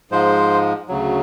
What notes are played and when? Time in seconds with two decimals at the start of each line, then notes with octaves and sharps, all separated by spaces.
0.11 G#2 F3 G#3 C5
0.88 D2 C#3 F#3